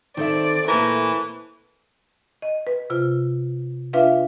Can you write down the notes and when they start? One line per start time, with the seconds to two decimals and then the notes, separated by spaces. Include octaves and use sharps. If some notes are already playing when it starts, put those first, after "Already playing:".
0.17 D#3 C4 A4 D5 E5
0.68 A#2 E3 A3 A#4
2.42 D#5
2.67 B4
2.90 C3 F4
3.93 D4 F4 B4 E5 F5